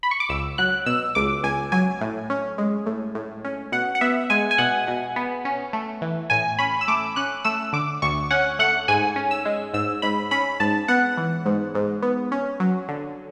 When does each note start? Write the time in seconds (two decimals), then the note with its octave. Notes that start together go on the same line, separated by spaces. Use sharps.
0.03 B5
0.11 C#6
0.20 D6
0.29 C#2 E6
0.58 F#3 F#6
0.86 B2 E6
1.15 C#2 D6
1.43 C#2 G#5
1.72 F#3 G#5
2.01 A2
2.30 C#4
2.58 G#3
2.86 A2
3.15 A2
3.45 C#4
3.72 B2 F#5
3.95 F#5
4.01 B3 E5
4.30 G#3 G#5
4.51 G#5
4.58 B2 F#5
4.88 B2
5.16 B3
5.45 C#4
5.73 A3
6.02 E3
6.30 A2 G#5
6.59 C#4 B5
6.81 E6
6.88 A3 D6
7.16 C#4 F#6
7.45 A3 E6
7.73 D3 D6
8.02 D2 C#6
8.31 C#4 F#5
8.59 A3 F#5
8.88 G#2 G#5
9.16 C#4
9.31 E6
9.45 G#3
9.74 G#2 E6
10.02 G#2 B5
10.31 C#4 B5
10.60 G#2 A5
10.88 B3 F#5
11.17 E3
11.46 G#2
11.75 G#2
12.02 B3
12.32 C#4
12.60 F#3
12.88 D3